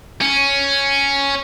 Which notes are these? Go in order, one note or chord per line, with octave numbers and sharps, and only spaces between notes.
C#4